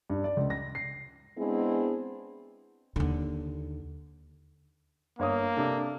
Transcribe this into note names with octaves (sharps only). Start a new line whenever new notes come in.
G2
D5
C#2
A#6
C7
G#3 B3 C4 D4 E4 G#4
D#2 D3
G1 A#3 C#5 D#6
C3 D4 A4